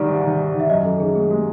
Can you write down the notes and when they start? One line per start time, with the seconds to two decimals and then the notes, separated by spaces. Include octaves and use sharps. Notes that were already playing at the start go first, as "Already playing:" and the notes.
Already playing: C2 D#3 G3 D5
0.08 G#2
0.24 D#3
0.39 G3
0.54 D#3
0.60 E5
0.70 F#2 D#5
0.85 F#2 A4
1.00 D#3 G#4
1.15 G#3 G#4
1.30 G#3 G4